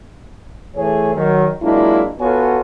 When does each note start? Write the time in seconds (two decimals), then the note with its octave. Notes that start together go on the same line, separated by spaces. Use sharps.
0.75 E3 A3 G#4 C#5
1.15 D#3 F#3
1.62 F#3 G#3 A#3 D4 E4 F4
2.20 B3 F4 F#4 A4 C#5 G#5